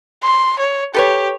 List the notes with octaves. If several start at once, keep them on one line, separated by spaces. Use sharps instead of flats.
C6
C#5
G4 A4 B4 C#5